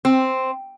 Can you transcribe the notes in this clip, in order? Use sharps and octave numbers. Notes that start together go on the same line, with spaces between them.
C4